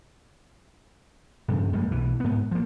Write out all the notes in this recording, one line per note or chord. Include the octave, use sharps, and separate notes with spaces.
G2 C#3 F3
F2 G3 G#3 A#3
B1 E3
G#2 B3
F3 A#3